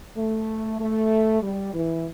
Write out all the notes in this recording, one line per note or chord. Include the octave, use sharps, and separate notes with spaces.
A3
A3
G3
E3